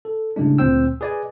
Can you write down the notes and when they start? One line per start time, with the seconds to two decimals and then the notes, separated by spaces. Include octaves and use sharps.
0.05 A4
0.36 A2 C#3 G3 G#3 D4
0.58 D2 A#2 C4 C5 G5 E6
1.01 G#4 B4 D5 D#5 G#5